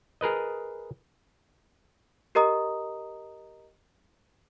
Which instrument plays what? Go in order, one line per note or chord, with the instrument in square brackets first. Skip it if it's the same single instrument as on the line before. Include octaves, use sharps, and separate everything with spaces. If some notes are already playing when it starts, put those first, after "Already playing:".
[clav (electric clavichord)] G#4 A#4 B4 D#5
[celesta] G4 A#4 D#5 A#5 D#6